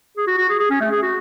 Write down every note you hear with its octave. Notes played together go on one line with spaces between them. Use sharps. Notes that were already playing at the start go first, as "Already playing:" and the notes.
G#4
F#4
F#4
G#4
G#4
C#4
A3
G#4
F#4